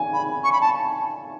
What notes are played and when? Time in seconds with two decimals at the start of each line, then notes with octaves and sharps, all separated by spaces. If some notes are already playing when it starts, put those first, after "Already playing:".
Already playing: G#5
0.13 B5
0.44 C#6
0.52 B5
0.61 A5